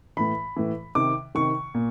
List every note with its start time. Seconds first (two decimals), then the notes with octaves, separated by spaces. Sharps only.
0.17 A2 E3 B5
0.56 A2 E3
0.95 C3 D#3 D6
1.35 C3 D#3 C#6
1.74 A#2